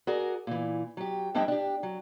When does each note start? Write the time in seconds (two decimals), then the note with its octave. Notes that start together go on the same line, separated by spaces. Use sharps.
0.07 F#4 G#4 A#4 D5
0.47 A#2 E3
0.97 F#3 G4
1.34 F2 G3 D4 E4 D#5 G5
1.48 D4 G4
1.83 F#3